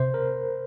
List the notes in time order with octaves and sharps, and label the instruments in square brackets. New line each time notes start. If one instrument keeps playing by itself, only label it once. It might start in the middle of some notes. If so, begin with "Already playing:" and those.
Already playing: [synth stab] C3 [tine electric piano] C5
[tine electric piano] A#4